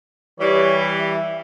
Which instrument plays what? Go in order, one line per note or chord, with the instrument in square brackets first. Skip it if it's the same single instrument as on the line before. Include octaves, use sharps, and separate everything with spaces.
[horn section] E3 G3 [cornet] C#5
[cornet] E5